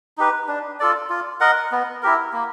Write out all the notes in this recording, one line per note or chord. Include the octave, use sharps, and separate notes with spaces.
D#4 G4 B4
D4
F4 A4 D5
F4
A#4 D#5 F#5
B3
E4 G4 A#4
A#3